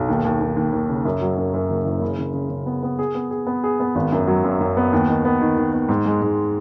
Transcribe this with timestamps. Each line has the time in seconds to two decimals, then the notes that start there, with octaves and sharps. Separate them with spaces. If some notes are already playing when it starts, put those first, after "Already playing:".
Already playing: B1
0.08 D#2
0.25 D#2
0.40 D#2
0.56 D#2
0.72 D#2
0.89 C#3
1.05 F#2
1.21 F#3
1.37 F#2
1.54 F#2
1.70 F#1
1.86 F#1
2.02 C#3
2.19 C#3
2.34 C#3
2.50 C#3
2.66 B3
2.83 B3
2.99 G#4
3.15 B3
3.31 G#4
3.47 B3
3.64 G#4
3.80 B3
3.95 G#1
4.12 F#2
4.28 F#3
4.44 F#2
4.61 F#2
4.77 B3
4.93 D#2
5.08 D#3
5.25 B3
5.41 D#3
5.57 D#3
5.73 B3
5.89 G#2
6.06 G#3
6.22 G#2